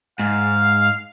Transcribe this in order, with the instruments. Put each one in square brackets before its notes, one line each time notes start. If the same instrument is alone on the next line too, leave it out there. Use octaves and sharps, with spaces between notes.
[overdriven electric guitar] G#2 [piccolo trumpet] F5